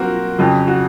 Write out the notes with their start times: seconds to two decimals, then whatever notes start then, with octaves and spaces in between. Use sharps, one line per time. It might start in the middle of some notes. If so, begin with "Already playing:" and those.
Already playing: F#3 A#3 C4 F#4 A#4
0.38 F2 C#3 F#3
0.68 F#4